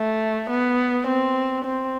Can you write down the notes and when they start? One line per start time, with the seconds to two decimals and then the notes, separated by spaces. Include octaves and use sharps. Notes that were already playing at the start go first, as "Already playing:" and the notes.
Already playing: A3
0.50 B3
1.07 C4
1.65 C4